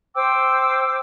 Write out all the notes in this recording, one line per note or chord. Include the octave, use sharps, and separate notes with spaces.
C5 G5 D6 E6